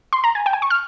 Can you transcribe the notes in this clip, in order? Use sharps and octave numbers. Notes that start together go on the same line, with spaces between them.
C6
A#5
G#5
G5
G#5
C#6
F6